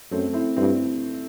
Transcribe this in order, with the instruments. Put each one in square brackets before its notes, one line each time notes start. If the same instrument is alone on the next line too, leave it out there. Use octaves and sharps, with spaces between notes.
[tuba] F#2 [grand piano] A3 C4
[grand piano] C4 E4
[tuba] G2 [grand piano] C4 E4